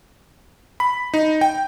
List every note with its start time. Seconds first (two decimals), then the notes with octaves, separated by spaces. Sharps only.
0.80 B5
1.14 D#4
1.41 G5